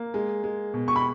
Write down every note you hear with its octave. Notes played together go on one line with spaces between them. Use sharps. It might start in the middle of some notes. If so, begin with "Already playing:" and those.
Already playing: A#3
G#3
G#3
B2
C#6
B5